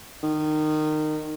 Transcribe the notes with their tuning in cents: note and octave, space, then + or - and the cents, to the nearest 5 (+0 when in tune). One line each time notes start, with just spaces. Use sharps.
D#3 -20